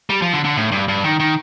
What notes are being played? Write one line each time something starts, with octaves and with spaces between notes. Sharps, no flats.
G3
F3
D3
D3
A2
G2
G2
D#3
D#3